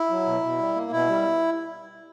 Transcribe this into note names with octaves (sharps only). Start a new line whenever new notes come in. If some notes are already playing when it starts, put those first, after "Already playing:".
Already playing: E4
F#3
B2
B2
G3
A#3
B2 E4
G3